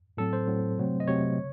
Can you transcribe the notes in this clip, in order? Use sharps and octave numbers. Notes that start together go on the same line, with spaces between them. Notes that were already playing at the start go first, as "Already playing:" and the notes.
A2 F#3 C4 A4
C5
A2 F#3 C4
C3 F#3 A3 C4
D#5
C3 F#3 A3 C4 C#5
C#3